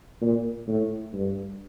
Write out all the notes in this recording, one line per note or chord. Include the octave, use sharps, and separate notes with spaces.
A#2
A2
G2